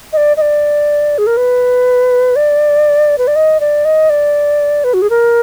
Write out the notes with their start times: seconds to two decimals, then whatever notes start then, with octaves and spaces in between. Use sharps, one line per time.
0.13 D#5
0.17 D5
0.37 D#5
0.41 D5
1.18 G#4
1.27 A#4
1.37 B4
2.36 D5
3.18 B4
3.27 D5
3.36 D#5
3.60 D5
3.85 D#5
4.10 D5
4.84 B4
4.94 F#4
5.02 G#4
5.10 A#4